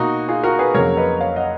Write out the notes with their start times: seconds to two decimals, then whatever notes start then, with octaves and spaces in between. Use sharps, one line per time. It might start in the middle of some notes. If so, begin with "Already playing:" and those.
Already playing: B2 A#3 D#4 F#4
0.28 F4 G#4
0.43 F#4 A#4
0.59 G#4 B4
0.74 F2 C#3 F#3 A#3 A#4 C#5
0.97 B4 D#5
1.20 C#5 F5
1.36 D#5 F#5